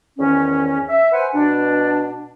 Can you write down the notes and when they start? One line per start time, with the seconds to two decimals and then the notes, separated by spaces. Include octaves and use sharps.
0.18 E2 G#2 D#3 C#4
0.88 E5
1.12 B4 C5 F#5 G#5
1.35 B2 D4